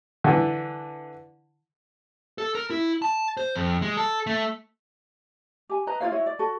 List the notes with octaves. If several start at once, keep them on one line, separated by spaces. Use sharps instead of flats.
D3 E3
A4
A#4
E4
A5
C5
F2
G#3
A4
A3
G4 G#5
B4 D#5 A#5
E4 F4 C#5 F5
E4 F#4 C#5
D5
F#4 A4